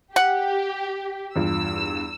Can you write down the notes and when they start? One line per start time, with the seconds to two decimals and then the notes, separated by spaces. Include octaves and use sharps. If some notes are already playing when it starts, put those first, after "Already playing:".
0.16 G4 F#5
1.36 E2 G2 F4 E6